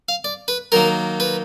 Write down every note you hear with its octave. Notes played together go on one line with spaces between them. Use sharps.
F5
D5
B4
D#3 F#3 A#3 A#4
B4